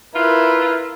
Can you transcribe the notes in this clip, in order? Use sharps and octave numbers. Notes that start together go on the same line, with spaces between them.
E4 F4 A#4 B4